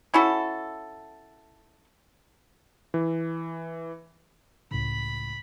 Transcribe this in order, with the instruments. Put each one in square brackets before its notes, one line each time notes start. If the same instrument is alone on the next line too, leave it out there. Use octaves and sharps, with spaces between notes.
[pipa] C#4 E4 F#4 A4
[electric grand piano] E3
[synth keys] C#2 A2 C#3 [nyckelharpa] B5